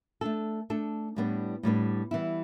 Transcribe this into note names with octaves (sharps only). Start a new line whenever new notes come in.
A3 D4 A4
A3 D4 A4
A2 G3 B3 D4
A2 G3 B3 D4
E3 G3 B3 E4